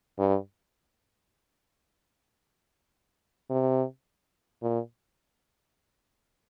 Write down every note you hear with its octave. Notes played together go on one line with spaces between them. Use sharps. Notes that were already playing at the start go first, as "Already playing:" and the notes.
G2
C3
A#2